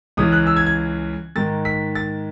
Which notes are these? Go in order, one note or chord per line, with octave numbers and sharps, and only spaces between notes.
C#2 C#3 E3 D#6
F#6
E6
G#6
G#6
G#2 D#3 A6
B6
A6